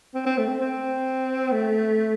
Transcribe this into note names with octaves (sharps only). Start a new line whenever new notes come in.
C4
C4
A3
C4
C4
A3